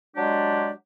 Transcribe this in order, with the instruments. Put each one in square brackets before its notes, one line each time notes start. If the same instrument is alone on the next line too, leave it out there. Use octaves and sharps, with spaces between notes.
[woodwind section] F#3 G#3 D4 G4 D5